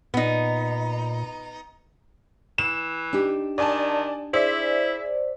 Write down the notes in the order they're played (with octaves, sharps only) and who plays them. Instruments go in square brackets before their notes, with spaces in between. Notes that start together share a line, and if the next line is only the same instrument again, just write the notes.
[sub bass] A#2 [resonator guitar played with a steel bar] B3 D#4
[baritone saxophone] E3 [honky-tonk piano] E7
[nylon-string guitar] D4 D#4 G4
[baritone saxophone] D#3 [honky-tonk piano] D5 G#5 A5
[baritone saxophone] E4 [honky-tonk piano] G#4 E5 [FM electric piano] C5 D5